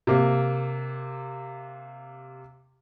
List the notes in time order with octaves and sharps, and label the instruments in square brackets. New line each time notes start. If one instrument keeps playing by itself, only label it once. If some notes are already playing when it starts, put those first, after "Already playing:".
[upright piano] C3 A#3